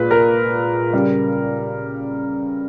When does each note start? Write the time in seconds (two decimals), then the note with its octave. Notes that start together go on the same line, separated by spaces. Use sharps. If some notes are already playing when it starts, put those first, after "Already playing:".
Already playing: A#2 G#3 B4
0.11 A#4
0.93 C#3 G3